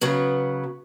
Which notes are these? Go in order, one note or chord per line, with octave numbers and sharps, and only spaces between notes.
C#3 F#3 B3